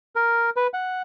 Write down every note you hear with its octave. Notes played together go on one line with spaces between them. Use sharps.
A#4
B4
F#5